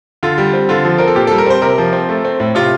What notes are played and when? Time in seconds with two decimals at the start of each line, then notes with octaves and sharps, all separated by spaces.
0.23 D3 F4
0.38 G3
0.54 C4
0.69 D3 F4
0.85 F3
0.98 C4 A#4
1.07 A4
1.15 A#2 G4
1.27 A4
1.31 G3
1.38 A#4
1.47 C4 C5
1.62 C3 A#4
1.78 F3
1.93 C4
2.09 A3
2.25 C4
2.40 A2
2.55 C3 F4